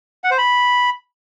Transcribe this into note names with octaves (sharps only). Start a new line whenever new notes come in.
F#5
C5
B5